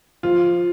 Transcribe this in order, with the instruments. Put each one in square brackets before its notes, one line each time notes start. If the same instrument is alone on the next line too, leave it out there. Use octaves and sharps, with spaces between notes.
[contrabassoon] F3 [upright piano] F4